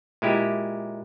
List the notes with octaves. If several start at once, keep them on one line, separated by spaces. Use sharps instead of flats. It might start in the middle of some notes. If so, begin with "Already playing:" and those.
A#2 G#3 E4 G4